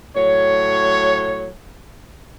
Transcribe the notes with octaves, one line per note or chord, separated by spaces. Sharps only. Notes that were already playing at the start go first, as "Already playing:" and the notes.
A2 F#3 C#5